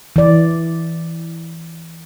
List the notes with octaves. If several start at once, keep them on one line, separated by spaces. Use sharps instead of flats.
E3 D5